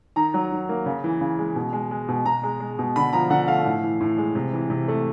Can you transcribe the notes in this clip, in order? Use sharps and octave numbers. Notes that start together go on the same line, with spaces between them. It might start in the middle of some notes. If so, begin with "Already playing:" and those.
D#3 A#5
F#3
D#3
A#3
C#3
E3
C#3
G#3
B2
G#3
G#3
B2
B2 A#5
G#3
G#3
B2
D3 B5
F3 A#5
D3 F#5
A3 F5
A2
E3
A2
G#3
C3
E3
C3
A3